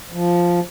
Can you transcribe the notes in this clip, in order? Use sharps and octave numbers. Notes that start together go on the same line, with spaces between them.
F3